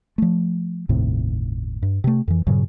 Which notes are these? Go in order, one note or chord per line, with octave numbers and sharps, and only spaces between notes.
F3 A3
G1 D#2 A2 C3
G2
C3 A3
F2 E3
G2 A#2 C#3 F#3